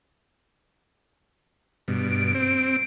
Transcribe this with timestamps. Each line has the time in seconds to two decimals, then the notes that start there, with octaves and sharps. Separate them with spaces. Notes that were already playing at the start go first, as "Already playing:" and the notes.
1.88 G2 B2 D7
2.35 C4